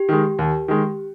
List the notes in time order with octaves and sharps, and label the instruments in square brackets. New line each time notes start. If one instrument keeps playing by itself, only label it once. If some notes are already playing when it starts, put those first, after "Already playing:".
Already playing: [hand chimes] G4
[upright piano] D#3 G#3
D#2
D#3 G#3